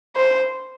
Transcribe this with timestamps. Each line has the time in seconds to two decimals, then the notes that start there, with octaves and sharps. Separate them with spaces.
0.16 C5